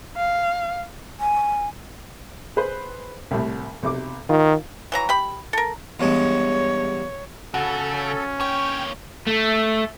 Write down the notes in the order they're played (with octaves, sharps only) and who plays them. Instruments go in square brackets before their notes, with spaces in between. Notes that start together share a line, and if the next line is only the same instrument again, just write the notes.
[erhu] F5
[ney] G#5
[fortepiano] G#4 B4 C5
C2 A2 C3
B1 C3 D6
[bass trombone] D#3 [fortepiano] F4
[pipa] E3 F#3 A#5
G4 B5
A4 A#4
[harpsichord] E2 G2 G#3 [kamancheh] C#5
[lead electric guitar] C#3 [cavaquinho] F#4 [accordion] A4
[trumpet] C#4
[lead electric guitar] A#3 C#5 [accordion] G5 [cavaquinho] C#6
[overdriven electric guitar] A3